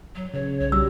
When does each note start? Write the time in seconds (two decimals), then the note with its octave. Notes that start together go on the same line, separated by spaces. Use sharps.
0.15 F#3
0.34 C#3 C#5
0.60 B1 C#5
0.72 G3 F#4 E6